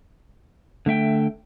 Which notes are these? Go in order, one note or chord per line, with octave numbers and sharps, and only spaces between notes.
D3 A3 E5 G5